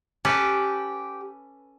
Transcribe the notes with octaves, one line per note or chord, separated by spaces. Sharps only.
C#4 G4 A4 B4